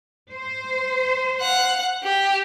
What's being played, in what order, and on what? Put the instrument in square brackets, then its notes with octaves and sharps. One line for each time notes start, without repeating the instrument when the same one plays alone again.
[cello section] C5
[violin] F5 F#5
G4